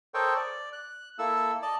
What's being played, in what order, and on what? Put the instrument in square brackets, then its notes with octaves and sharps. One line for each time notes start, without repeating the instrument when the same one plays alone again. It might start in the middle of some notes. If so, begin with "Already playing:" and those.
[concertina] A4 A#4 C5 C#5 D#5 G5
D5
F#6
A#3 E4 A4 E6
D5 D#5 A5